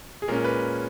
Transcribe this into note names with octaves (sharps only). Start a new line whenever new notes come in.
G#4
A#2 G#3 C#4 A#4
B4